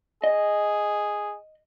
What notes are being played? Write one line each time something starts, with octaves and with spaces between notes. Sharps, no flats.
G#4 D#5